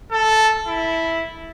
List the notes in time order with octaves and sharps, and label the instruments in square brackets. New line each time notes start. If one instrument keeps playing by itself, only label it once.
[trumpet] A4
E4